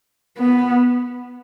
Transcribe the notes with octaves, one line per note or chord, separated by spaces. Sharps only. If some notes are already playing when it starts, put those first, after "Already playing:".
B3